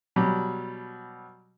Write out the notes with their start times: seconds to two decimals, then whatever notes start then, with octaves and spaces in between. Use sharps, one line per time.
0.16 B2 F#3 G3